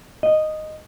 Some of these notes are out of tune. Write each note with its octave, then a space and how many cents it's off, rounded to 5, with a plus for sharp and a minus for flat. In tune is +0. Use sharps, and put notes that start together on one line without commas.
D#5 -5